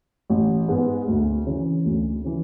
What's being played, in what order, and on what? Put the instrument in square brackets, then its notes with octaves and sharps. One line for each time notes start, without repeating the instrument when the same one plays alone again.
[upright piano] A1
G#2 G#3 B3
D2
C#3 E3
D2
C#3 E3